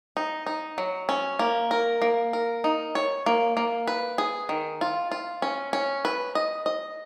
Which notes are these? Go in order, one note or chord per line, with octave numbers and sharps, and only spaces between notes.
D#4
D#4
F#3
C#4
A#3
A#4
A#3
A#4
D#4
C#5
A#3
A#3
B4
G#4
D#3
F4
F4
C#4
C#4
B4
D#5
D#5